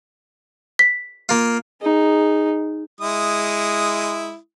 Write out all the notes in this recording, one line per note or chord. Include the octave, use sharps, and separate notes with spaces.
B6
A#3 F4
D#4 G#4
G#3 E4 D#6